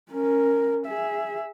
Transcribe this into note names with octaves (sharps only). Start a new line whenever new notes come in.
C#4 A#4
G#4 E5